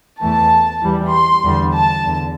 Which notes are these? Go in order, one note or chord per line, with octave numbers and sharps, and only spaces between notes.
E2 E3 A3 A5
E2 E3 G3
C6
E2 D3 G3
A5
E2 D3